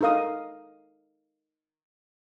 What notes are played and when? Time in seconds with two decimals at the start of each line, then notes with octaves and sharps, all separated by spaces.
0.01 D#4 A4 A#4 F5 D#6